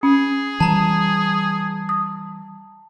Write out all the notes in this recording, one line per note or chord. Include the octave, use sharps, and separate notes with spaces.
C#4 G#4
E3 G3 A5 A#5
D#6